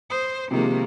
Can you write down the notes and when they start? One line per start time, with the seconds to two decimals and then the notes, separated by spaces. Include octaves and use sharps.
0.10 C5 D#6
0.51 C3 D#3 F3 G#3 A#3